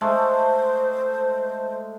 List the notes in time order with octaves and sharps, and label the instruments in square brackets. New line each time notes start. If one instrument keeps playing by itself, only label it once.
[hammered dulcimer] G#3 A3 [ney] C5